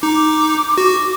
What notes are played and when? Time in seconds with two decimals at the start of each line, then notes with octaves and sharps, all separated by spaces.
0.02 D#4 D6
0.77 F#4 D6